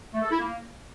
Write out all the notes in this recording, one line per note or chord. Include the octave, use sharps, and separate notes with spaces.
A3
A4
E4
A#3